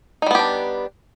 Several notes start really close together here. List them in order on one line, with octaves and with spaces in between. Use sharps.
D#4 G3 B3 G4 D4